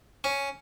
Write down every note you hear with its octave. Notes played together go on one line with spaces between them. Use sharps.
C#4